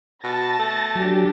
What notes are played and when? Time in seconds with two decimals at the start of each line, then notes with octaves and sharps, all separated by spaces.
0.24 B2 A5 A6 A#6
0.59 A3
0.95 F#3 D4 G4